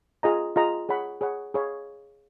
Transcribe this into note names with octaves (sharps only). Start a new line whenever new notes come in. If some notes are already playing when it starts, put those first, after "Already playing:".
F4 G#4 D#5 A#5
F4 G#4 D#5 A#5
G#4 C#5 F#5 B5
G#4 C#5 F#5 B5
G#4 C#5 F5 B5